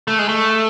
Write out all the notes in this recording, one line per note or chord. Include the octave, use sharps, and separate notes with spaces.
A3
G#3
A3